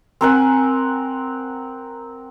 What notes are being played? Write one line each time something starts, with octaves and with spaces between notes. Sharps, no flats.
C4 A#4 F#5 G#5